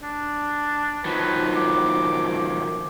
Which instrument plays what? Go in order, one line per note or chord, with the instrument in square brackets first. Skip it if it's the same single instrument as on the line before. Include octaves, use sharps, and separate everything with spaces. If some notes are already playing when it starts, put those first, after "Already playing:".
[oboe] D4
[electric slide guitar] D#3 F3 F#3 [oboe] B4
[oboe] D6